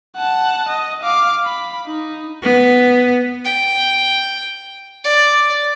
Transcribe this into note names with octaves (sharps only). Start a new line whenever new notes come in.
F#5 A5
D#5
F5 D6
B5
D#4
B3
G5
D5